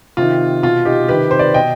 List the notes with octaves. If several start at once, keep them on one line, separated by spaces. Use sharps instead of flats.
C3 D#3 F4
B2 F4
D#4 G4
C3 D#3 G4 B4
C5
B4 D5
B2 D#5 G5